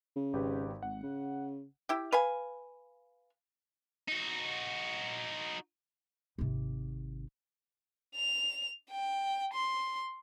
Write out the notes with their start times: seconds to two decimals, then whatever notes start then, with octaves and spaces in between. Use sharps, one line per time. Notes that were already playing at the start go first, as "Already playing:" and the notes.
0.16 C#3
0.33 G#1 G4 B4
0.83 G#1 F#5
1.03 C#3
1.89 E4 G4
2.12 B4 F5 G#5
4.08 D#4 F#4
6.39 G#1 C3
8.16 F7
8.91 G5
9.53 C6